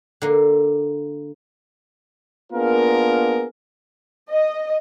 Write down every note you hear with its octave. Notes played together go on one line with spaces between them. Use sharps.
D3 A#3
A#3 B3 D4 F4 G#4 A#4
D#5